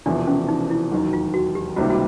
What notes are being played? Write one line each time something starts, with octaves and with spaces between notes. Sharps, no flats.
E1 E2 C3 F3 D4
C#4
D#4
E4
E1 D#2 D#3 F#3
F4
F#4
G4
C#2 C3 D#3 G3 A#3 F#4
F#4